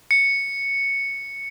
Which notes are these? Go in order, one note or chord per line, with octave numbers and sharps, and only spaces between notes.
C#7